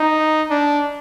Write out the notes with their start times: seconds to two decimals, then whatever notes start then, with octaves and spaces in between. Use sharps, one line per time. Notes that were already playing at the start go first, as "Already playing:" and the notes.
Already playing: D#4
0.50 D4